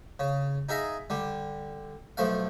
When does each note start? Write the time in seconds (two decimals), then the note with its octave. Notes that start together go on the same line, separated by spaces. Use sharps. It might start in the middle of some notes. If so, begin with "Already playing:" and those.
0.19 C#3
0.69 D#4 G#4 E5 F5 A#5
1.10 D3 G3
2.17 B1 F3 A3 F5